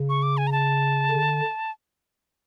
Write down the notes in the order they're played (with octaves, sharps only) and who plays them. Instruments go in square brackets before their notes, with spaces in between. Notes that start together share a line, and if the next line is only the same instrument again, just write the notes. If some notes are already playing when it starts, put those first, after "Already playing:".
Already playing: [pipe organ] C#3
[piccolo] C#6
D6
G#5
A#5
A5
[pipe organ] D3